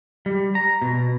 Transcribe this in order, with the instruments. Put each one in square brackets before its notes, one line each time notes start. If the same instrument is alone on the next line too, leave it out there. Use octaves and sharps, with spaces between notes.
[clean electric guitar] G3
A#5
B2